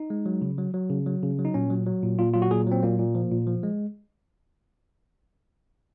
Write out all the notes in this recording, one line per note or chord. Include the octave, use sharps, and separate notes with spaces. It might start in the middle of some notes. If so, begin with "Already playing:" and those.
Already playing: D#4
G#3
F#3
C#3
F#3
F#3
C#3
F#3
C#3
F#3
D#4
A#2 C#4
F#3
F#3
A#2
A#2 F4
F#3 F4
F#4
A#2 G#4
F#3 C4
A#2 A#3
A#2
F3
A#2
F3
G#3